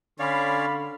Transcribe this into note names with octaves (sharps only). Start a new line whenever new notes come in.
D3 C#4 C#5 D5 F5 B5 C6